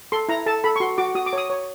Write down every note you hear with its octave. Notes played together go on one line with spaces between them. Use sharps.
A4 C6
E4 A#5
A4 A5
A4 B5
C#6
F#4 C6
F#4 D6
F#4 D#6
D6
C#5 D#6
C#5